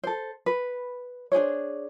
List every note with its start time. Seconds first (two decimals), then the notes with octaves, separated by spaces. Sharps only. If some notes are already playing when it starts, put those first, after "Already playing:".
0.03 A4 C5
0.46 B4
1.32 D4 G#4 C5 C#5